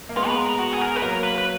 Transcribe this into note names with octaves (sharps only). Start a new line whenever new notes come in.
A#3
G#3 B3 F4
B4
A#4
A#4
F#4
G#4
A#4
B3 B4
F#3 A#3 A#4
B4
B4